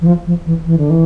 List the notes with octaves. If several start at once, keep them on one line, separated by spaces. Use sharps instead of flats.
E3
F3
F3
E3
E3
D3
E3